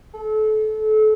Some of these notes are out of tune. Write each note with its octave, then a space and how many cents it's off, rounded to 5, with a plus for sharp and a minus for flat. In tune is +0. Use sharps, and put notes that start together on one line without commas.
A4 -30